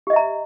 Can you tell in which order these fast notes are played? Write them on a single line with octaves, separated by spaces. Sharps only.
G4 D#5 E5 A#5